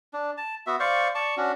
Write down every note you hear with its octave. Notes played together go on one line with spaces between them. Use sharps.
D4
A5
B3 F#4 E5
C5 D5 F5 C#6
D5 A5 C#6
C#4 D4 F#4